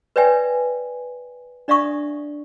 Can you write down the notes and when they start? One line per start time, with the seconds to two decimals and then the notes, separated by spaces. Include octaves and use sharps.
0.16 B4 C#5 D5 E5 G5 G#5
1.68 D4 D5 E5 F5 C#6 D#6